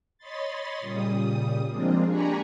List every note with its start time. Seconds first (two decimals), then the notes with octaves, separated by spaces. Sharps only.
0.18 C#5 D#5 B5 C6 A6
0.80 A#2 C#3 G3 D#6
1.68 F3 G#3 A#3 C4 D4 F4
2.09 D4 G4 G#5 A#5 B5 C#6